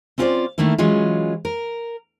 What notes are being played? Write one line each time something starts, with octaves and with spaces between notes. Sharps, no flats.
C4 C#4 F4 A4 C5 D5
D#3 A3 A#3 D4 E4
E3 F#3 G#3 C#4 F4
A#4